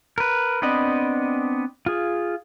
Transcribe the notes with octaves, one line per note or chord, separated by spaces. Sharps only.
A#4 B4
B3 C4 D4 D#5 B5
F4 G#4